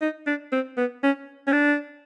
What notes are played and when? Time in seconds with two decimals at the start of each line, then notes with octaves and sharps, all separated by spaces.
0.01 D#4
0.27 D4
0.52 C4
0.77 B3
1.03 C#4
1.47 C#4
1.53 D4